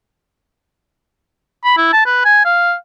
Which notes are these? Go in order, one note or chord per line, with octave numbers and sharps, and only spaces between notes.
B5
E4
A5
B4
G#5
F5